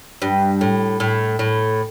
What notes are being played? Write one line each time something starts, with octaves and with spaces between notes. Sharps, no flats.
G2
A2
A2
A2